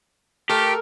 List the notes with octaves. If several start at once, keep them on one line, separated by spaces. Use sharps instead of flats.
A3 G4 A4 A#4